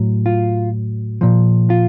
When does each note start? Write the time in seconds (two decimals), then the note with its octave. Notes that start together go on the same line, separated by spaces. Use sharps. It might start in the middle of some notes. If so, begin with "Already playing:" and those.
Already playing: A2 F#3
0.26 F4
1.21 A#2 F3
1.70 F4